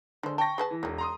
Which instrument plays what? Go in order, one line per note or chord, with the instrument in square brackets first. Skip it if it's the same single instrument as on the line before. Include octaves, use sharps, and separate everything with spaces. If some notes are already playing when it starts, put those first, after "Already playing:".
[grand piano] D3 [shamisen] G#3 C5
[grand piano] G5 C#6 A#6 [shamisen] A5
[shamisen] G#4 B4 A5
[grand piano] E3
[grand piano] E1 [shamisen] D#3 F#3
[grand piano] A#5 C6 D#6